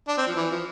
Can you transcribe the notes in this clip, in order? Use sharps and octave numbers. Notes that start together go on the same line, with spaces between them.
D4
C4
F3
E3
F3